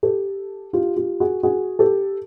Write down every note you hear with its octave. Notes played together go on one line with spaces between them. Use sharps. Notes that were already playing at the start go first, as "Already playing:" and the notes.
G4 A4
F4 G4
F4 G4
F#4 G#4
F#4 G#4
G4 A4